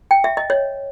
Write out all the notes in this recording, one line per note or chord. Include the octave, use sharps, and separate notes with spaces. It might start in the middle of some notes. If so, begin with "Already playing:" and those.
G5
E5
D#5
C#5